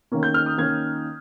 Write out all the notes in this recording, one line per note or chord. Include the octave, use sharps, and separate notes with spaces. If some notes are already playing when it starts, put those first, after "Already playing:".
D#3 A#3 C#4
G6
F6
D#6
D#3 A#3 C#4 G#6